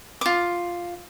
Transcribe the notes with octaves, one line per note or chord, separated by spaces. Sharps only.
F4 D6